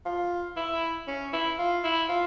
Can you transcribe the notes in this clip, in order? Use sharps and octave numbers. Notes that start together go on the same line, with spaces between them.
F4
E4
C#4
E4
F4
E4
F4